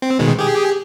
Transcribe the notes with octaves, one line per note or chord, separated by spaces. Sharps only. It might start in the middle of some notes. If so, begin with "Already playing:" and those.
C4
B2 D#3 G#3
G4 G#4